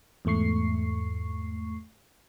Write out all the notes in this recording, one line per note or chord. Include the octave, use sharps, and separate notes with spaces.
E2 G#2 A3 C#6 C7